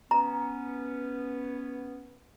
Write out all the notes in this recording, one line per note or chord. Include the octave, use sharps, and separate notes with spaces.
B3 C#4 A#5